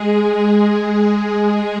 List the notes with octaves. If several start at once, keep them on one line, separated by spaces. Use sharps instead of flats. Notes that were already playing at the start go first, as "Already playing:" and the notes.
Already playing: G#3 G#4
G#3
G#3